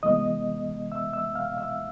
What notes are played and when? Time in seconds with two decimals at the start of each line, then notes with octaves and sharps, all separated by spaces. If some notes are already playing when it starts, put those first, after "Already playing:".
0.03 C3 E3 G#3 B3 D#5 D#6
0.92 E5 E6
1.13 E5 E6
1.35 F5 F6
1.57 E5 E6